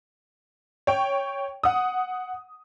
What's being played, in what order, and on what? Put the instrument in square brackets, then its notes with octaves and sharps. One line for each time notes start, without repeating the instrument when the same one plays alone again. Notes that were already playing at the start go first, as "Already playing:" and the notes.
[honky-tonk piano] C#5 G5
F#5 D#6